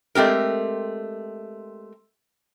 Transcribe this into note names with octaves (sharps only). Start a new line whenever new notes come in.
G#3 A3 C4 G4 A#4